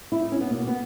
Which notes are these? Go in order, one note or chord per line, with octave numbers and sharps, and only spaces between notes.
E4
D#4
C#4
B3
B2 A#3
B3